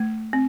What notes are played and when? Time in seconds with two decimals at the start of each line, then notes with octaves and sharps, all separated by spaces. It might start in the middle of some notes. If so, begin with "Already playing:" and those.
Already playing: A3
0.33 C4